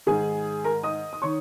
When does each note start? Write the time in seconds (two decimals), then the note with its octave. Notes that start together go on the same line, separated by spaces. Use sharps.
0.06 G#2 D#3 G#4 G#5
0.64 A#4 A#5
0.83 D#5 D#6
1.13 D#6
1.22 D#3 C#5 C#6